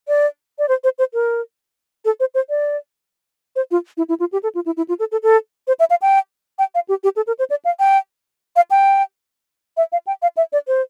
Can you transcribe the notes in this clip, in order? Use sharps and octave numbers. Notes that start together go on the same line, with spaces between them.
D5
D5
C5
C5
C5
A#4
A4
C5
C5
D5
C5
F4
E4
E4
F4
G4
A4
F4
E4
E4
F4
A4
A4
A4
C5
E5
F5
G5
G5
F5
G4
G4
A4
A#4
C5
D5
F5
G5
F5
G5
E5
F5
G5
F5
E5
D5
C5